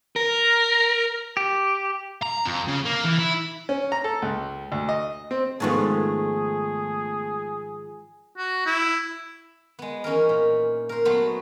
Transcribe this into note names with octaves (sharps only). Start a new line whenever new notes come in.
A#4
G4
A#5
F2
C#3
A#3
E3
E4
C#4
A#5
A4
C#2
D2
D#5
C4
G#2 D#3 F3 G#3 A3 B3 G#4
F#4
E4
G#3 B3
E3 C#4 D#4 A#4
A#2
A#4 C5
F#3 A3 B3 C5